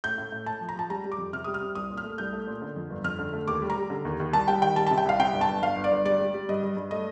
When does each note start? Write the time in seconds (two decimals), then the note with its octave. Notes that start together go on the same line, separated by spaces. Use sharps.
0.04 A2 G6
0.18 A2
0.32 A2
0.46 A2 A5
0.61 F3
0.69 A#5
0.76 F3 A5
0.90 G3 A#5
1.04 G3
1.12 D6
1.18 F2
1.33 C3 F6
1.44 G3 D#6
1.54 F6
1.61 C4
1.75 C2 D#6
1.90 A#2
1.97 F6
2.04 A3
2.18 C2 G6
2.33 A3
2.47 A#2
2.62 D3
2.76 F2
2.90 G1
3.04 F2 F6
3.19 D3
3.33 A3
3.48 D#2 D6
3.62 G3
3.70 A#5
3.77 G3
3.90 D3
4.05 D#2
4.20 D#2
4.33 C2 A5
4.48 G3 G5
4.62 D#3 G5
4.76 G3 A5
4.87 C3 A5
4.98 G5
5.06 C2 F5
5.19 C3 G5
5.34 G1
5.41 A5
5.49 G1
5.62 G1 F5
5.76 G1
5.84 D5
5.91 G1
6.05 G3 D5
6.20 G3
6.34 G3
6.49 G2 D#5
6.63 G2
6.77 G2
6.91 A3 D#5